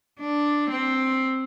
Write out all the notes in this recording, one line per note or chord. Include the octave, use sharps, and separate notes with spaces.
D4
C4